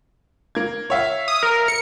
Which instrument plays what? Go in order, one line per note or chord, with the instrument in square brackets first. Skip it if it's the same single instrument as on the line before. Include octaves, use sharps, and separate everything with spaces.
[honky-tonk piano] A#3 G#6
C#5 E5 F5
[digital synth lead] D#6
A#4
C#7